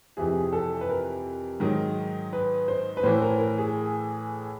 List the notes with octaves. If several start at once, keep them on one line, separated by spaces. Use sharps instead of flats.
F2 C3 E3 G#4
A4
B4
A#4
G#2 D#3 F#3
B4
C5
B4
A2 E3 C5
A#4
A#4
G#4